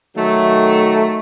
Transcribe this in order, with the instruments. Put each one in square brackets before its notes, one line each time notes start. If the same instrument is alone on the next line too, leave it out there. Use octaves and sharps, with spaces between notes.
[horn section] D#3 F#3 A3